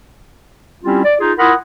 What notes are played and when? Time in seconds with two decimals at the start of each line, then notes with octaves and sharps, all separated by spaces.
0.84 G3 C4 C#4 E4 F4 G4
1.04 D5
1.20 D#4 F4 G#4
1.38 E4 F4 A#4 F#5 B5 D#6